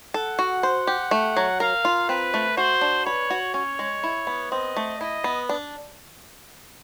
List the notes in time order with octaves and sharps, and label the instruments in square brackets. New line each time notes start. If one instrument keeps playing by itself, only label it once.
[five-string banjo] A4 [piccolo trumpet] F#5
[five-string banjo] F#4
C5
G4
A3
F#3
[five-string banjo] A#4 [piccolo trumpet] F5
[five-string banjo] F4
[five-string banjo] C4 [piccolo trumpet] B4
[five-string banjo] A3
[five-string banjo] F#4 [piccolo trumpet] C5
[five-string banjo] D4
[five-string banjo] B4 [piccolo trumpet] C#5
[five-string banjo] F#4
[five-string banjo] C#4 [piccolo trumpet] C#5
[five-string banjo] G#3
E4
B3
[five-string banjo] C4 [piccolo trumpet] D#5
[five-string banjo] A3
[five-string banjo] E4 [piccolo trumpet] D#5
[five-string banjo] B3
D4